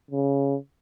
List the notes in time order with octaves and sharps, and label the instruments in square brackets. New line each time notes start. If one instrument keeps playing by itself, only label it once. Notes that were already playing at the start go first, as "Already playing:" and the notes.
[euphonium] C#3